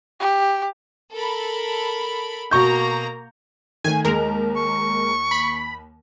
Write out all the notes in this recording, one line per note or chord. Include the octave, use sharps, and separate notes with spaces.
G4
A4 A#4 B5
B2 A#3 A#5 C#6 G6
D#3 A3 G#5
D#2 G#3 A#4 F7
C#6
B5